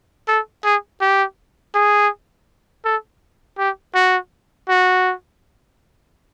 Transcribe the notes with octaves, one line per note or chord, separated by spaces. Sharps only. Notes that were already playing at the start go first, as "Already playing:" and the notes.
A4
G#4
G4
G#4
A4
G4
F#4
F#4